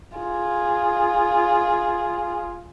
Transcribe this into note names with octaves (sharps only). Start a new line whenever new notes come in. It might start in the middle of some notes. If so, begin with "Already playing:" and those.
F4 G#4